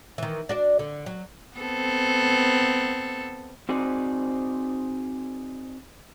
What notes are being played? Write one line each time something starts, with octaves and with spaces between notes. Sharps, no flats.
D#3 E3
D4 F#4 D5
D3
F#3
B3 C4 A4
C4 D#4 F#4 G#4 C5 D5